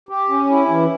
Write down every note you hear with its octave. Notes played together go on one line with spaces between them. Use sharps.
G4
C#4
E4
E3